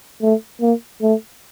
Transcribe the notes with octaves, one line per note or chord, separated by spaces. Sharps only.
A3
A#3
A3